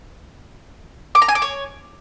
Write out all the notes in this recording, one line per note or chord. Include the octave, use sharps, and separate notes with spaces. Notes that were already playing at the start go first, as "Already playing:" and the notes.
D6
A#5
G#5
D6
C#5